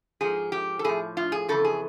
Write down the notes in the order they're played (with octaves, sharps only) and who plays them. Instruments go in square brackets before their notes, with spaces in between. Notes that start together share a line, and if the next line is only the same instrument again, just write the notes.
[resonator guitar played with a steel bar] G#2 F3 G#4
G4
A4
A2 F3 G#4
F4
G#4
F2 C#3 E3 A4
G#4